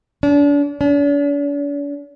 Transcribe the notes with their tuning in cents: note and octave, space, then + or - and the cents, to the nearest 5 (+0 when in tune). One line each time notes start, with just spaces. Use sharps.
D4 -35
D4 -45